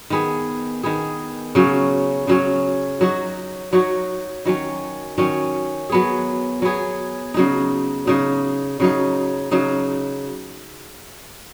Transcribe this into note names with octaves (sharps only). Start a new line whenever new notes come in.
D#3 B3 G#4
D#3 B3 G#4
C#3 F#3 C#4
C#3 F#3 C#4
F#3 D#4 F#4
F#3 D#4 F#4
D#3 F#3 C#4
D#3 F#3 C#4
F#3 B3 G#4
F#3 B3 G#4
C#3 F#3 D#4
C#3 F#3 D#4
C#3 F#3 D#4
C#3 F#3 D#4